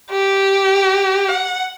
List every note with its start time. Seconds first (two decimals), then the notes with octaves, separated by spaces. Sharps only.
0.11 G4
1.29 F#5